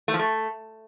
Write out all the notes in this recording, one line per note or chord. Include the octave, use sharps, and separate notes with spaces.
A3
F3
A3